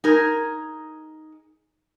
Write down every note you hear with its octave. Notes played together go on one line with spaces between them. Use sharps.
D#4 G#4 A#4